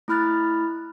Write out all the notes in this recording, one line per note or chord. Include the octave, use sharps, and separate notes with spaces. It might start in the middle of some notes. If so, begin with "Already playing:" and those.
A3 E4 B5 F6 F#6 A6